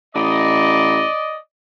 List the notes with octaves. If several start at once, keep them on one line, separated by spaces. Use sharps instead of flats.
A1 D5 D#5